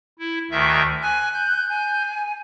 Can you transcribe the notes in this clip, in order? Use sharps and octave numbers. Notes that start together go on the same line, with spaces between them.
E4
D2 D#3 E5
G#5 F#6
G6
G#5